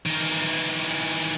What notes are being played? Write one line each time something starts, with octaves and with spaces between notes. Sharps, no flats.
D#3 E3